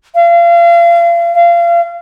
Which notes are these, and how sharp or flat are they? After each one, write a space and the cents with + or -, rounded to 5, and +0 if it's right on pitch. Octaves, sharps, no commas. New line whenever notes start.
F5 -35
F5 -30